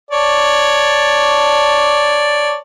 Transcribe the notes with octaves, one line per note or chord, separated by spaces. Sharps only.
C#5 D5 A5